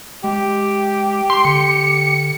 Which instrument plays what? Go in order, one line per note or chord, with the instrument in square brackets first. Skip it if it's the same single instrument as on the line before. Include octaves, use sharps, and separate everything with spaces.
[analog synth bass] G#3 [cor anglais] G4
[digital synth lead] C6
[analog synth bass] D3 [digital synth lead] C#7